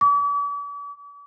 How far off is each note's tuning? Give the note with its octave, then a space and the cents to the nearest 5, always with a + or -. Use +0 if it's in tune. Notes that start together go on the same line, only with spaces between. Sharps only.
D6 -45